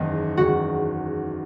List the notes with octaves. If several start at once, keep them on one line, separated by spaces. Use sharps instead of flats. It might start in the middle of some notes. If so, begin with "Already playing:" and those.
Already playing: F#1 E2 D#3 G#3 D#4
F#1 E2 D#3 G#3 F#4